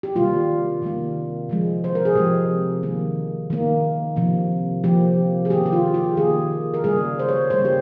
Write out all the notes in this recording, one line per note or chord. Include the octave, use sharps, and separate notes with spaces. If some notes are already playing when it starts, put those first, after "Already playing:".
G4
C3 D#3 G3 A#3 F4
C3 D#3 G3 A#3
C3 F3 G#3
C5
A#4
G#4
C3 F3 G#3 G4
D#3 A#3
D#3 A#3
C3 F3 A#3
C3 F3 A#3 G4
G#4
D#3 A#3 G4
G4
F4
G4
D#3 A#3 G#4
A#4
C#3 G3 A#3 G#4
C5
C#5
C#3 G3 A#3 C5
G4